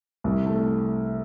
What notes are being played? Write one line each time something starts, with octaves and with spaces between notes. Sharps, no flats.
C2
A3